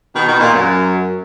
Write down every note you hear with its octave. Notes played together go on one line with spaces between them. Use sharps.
B2 D#3
B2 D#3
A#2
F#2